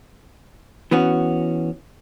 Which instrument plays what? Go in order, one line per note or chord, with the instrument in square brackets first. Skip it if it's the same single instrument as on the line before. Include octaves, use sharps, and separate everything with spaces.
[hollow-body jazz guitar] E3 B3 C#4 F#4